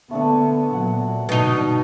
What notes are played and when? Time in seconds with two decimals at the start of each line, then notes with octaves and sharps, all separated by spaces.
0.11 D3 A3 B3 D4 A4
0.73 A#2 F#3 F#5
1.29 G1 B2 D#4 D#5 A5